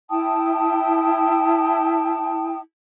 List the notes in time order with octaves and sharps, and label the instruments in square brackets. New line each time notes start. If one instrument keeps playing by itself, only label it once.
[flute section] E4 G5 A5 D#6